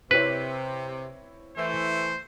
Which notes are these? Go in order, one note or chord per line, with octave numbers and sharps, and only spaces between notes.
C3 C4 E4 B4 C#5
E3 A3 C5